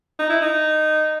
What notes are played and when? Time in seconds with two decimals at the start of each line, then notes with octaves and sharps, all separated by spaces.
0.19 D#4
0.29 E4
0.41 D#4